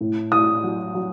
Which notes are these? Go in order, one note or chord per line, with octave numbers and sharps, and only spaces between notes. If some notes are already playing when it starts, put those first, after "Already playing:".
A2
A2 D#6
F#3
F#3